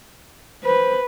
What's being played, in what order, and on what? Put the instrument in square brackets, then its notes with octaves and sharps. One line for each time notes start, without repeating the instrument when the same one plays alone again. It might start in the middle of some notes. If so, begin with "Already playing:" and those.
[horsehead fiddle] B4 [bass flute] C5